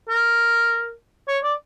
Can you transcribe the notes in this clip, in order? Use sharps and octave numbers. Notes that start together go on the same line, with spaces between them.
A#4
C#5
D5